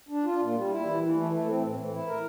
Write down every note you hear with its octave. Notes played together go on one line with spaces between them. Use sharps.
D4
F4
A#2
G3
E4
E3
E3
A3
A3
C4
A2
E3
E4
A#4